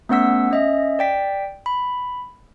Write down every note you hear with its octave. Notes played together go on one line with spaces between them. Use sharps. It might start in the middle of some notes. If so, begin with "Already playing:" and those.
A3 B3 C#4 F#5 E6 B6
C#4 D#5 E5
D5 G5 B6
B5